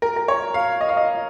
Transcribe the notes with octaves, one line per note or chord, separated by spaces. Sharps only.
A#4
A#4
C#5
F5
D#5
F5
D#5